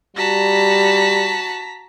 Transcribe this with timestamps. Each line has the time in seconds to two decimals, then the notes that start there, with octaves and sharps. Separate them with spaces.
0.16 G3 F#4 A5 A#5 B6